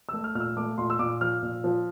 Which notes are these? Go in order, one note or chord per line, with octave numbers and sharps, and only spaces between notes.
A3 E6
F6
A#2 F6
E6
A3 D6
A#2 C6
E6
A#2 D6
F3 F6
A#2
F3